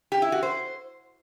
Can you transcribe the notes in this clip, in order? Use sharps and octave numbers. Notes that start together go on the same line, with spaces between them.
G4
E4
F#4
C5